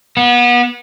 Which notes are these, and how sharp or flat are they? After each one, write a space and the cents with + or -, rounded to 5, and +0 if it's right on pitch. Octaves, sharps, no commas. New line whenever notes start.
B3 -30